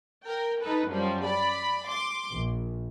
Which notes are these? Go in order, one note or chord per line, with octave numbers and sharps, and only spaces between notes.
A#4 G5
D#4 A4 B4
F#2 F3 G3
D5 B5
C6 D6
A#1